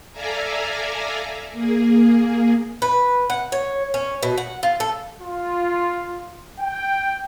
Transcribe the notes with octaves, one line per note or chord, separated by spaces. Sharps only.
A4 D5 E5 F5 G#5 A#5
A#3 G#4
B4
F#5
C#5
C#4
B2
F#5
F4
A4
F4
G5